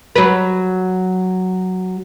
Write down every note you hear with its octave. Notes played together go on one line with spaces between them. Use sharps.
F#3 B4